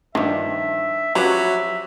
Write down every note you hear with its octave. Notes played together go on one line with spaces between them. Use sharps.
G2 D#3 F3 D4 E5
F3 F#3 C#4 G4 B4 E5